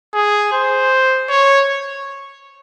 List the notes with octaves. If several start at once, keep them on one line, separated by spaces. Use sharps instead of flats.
G#4
C5
C#5